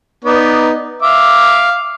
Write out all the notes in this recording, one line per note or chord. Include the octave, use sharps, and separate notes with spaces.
B3 D#4 D5
E5 F5 D6